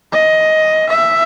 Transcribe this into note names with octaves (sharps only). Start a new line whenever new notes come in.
D#5
E5